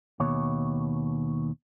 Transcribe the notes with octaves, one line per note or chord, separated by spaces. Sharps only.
D#2 B2 C#5